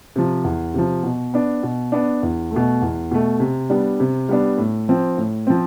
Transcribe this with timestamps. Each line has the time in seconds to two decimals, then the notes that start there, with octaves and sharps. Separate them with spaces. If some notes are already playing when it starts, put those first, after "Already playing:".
0.16 C3 F3
0.44 E2
0.74 C3 F3
1.03 B2
1.34 B3 D4
1.63 B2
1.92 B3 D4
2.23 E2
2.51 A3
2.56 B2
2.82 E2
3.11 B2 A3
3.40 C3
3.70 G3 B3 D4
4.00 C3
4.29 G3 B3 D4
4.58 A2
4.89 F3 C4
5.18 A2
5.47 F3 C4